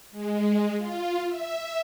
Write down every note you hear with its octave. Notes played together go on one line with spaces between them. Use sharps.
G#3
F4
E5